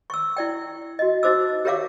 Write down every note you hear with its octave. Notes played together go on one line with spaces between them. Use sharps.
C#6 E6
E4 D5 G5
F#4 D#5
D#4 F#4 C5 D6 E6
G4 A#4 C#5 E5 F5 D6